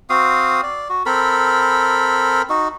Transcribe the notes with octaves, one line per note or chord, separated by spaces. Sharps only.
C4 F#4 F5 D#6
D5
F#4
C4 A4 A#4 B5
D#4 F#4